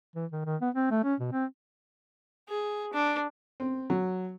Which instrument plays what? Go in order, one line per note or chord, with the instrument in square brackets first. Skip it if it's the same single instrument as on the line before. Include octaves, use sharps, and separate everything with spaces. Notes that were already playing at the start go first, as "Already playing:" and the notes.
[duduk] E3
D#3
D#3
B3
C4
A3
C#4
B2
C4
[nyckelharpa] G#4
D4
[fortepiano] C4
F#3